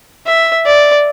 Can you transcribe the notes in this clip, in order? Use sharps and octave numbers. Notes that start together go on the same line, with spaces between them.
E5
D5